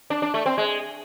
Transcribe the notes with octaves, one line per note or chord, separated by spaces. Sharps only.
D4
D4
A3
C4
G#3